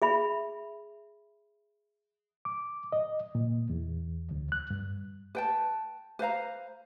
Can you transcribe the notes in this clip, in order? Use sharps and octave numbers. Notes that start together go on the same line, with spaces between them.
G#4 E5 B5
D6
D#5
A#2
E2
D2
F#6
G2
B4 G5 A5
B4 C5 F5 A#5